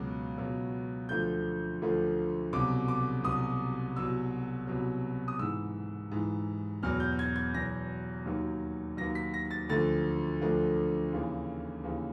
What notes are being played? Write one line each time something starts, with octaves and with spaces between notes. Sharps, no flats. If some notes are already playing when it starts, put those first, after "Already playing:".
Already playing: C#2 B2 F#3
C#2 B2 F#3
D2 D3 F3 G6
D2 D3 F3
C2 B2 F#3 D6
D6
C2 B2 F#3 D#6
C2 B2 F#3 E6
C2 B2 F#3
D#6
G#2 E3 E6
G#2 E3
E2 B2 F#3 F6
G6
G#6
G#6
E2 B2 F#3 A#6
D#2 D#3 F#3
D#2 D#3 F#3 A#6
B6
A#6
A6
D2 D3 F3 A6
D2 D3 F3
D#2 C#3 E3
D#2 C#3 E3